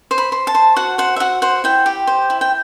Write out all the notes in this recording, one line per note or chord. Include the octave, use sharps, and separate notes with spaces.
C5
B5
C5
A5
C5
F#4 F#5
C5 F#5
E5
F#4 F#5
C5 F#5
E4 G5
G4
C5
E4
G5